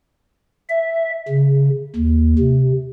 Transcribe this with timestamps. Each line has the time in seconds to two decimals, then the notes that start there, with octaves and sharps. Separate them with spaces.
0.69 E5
1.28 C#3
1.96 D#2
2.39 C3